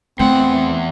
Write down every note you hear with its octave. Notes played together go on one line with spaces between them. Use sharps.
E2 E3 A3 C4 F#5